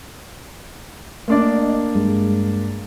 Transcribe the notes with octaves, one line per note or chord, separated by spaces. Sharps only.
A3 A#3 D4 D5 D#5 D6
G2 G#3